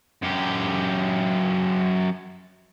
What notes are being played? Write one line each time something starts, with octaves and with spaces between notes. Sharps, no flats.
F#2 G4